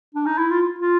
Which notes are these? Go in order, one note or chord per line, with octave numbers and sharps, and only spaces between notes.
D4
D#4
E4
F4
F4